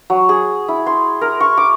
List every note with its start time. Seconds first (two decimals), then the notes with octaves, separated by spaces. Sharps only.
0.10 F#3
0.29 G#4
0.68 E4
0.86 C6
1.21 A#4
1.40 C#6
1.57 D6